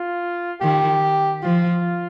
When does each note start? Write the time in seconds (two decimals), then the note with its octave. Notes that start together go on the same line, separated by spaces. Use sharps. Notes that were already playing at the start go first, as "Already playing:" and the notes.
Already playing: F4
0.61 D#3 G4
1.43 F3 F4